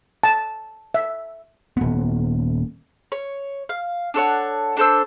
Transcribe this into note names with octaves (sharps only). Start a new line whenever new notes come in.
A5
E5
D#1 B3
C#5
F5
D4 A4 C#5 F#5
D4 A4 C5 E6